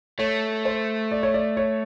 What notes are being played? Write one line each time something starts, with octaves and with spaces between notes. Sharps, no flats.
A3 C#5
C5
D5
C#5
D5
C#5